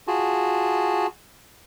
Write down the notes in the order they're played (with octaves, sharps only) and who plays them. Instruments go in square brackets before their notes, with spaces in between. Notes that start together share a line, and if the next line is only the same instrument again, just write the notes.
[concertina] F4 F#4 G#4 A5